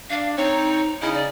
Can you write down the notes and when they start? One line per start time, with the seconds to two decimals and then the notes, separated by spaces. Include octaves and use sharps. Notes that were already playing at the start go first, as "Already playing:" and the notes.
0.10 D4 F5
0.37 C4 D#4 C#5
1.02 C#3 D#4 E4
1.13 D5